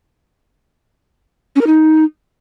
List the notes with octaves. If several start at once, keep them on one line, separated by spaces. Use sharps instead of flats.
C#4
A#4
D#4